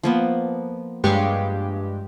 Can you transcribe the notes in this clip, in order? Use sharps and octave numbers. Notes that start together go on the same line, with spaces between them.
F3 A#3 B3
G2 G#3 G4 C#5 F5 C#6